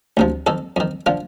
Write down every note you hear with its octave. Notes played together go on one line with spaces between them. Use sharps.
D2 C3 F3
F2 D#3 A4
F2 D#3
D3 F3 F4